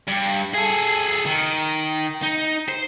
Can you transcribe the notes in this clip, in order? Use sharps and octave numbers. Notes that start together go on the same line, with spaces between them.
G2
G#4 A4
D#3
D#4
C5